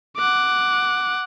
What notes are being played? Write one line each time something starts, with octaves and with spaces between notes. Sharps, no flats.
F#5 D6